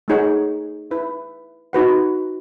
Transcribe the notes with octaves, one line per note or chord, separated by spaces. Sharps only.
A3 D#4 G#4 C#5 F#5
E4 B4 E5
D#4 F#4 B4 F#5